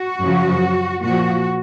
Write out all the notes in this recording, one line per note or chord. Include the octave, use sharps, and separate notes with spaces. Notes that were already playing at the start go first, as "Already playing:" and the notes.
Already playing: F#4
F#2 C#3 F3
A#2 F3 F#4